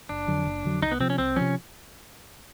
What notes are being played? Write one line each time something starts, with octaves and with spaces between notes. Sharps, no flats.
F#1 D4
F2 D3 F#3
F#1
F2 D3 F#3
C2 D#4
B3
C3 F3 C4
C#4
C2 C4
C3 F3 C#4